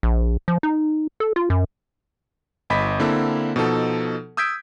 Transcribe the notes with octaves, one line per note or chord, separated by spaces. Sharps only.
A#1
F3
D#4
A4
F4
F#2
G1 D#5 B5 B6
D3 A#3 C4 E4 A4
B2 F3 D#4 A4
D#6 E6 G6 G#6 B6 D7